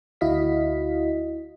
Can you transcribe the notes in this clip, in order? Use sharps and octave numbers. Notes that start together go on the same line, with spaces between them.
D2 E4 F#4 D#5 F5 B6